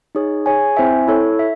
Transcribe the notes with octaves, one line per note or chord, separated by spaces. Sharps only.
D#4 G#4 C#5
G#4 C#5 G#5
C4 E4 C5 E5 G#5
E4 A4 C#5
E5